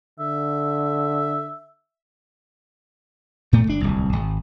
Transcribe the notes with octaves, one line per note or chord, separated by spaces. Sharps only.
D3 E5
A2 A3
G1 D4
D1 C2
G#1